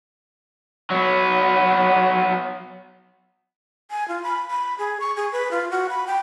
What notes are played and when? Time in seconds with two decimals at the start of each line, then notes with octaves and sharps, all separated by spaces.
0.91 F#3 B3
3.91 G#5
4.08 F4
4.23 B5
4.51 B5
4.79 G#4
5.00 C#6
5.17 G#4
5.32 B4
5.51 F4
5.71 F#4
5.89 B5
6.07 G5